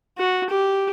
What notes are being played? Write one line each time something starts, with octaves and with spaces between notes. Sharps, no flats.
F#4
G4